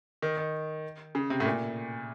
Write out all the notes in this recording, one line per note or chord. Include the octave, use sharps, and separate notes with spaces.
D#3
D#3
C#3
C3
A2
A#2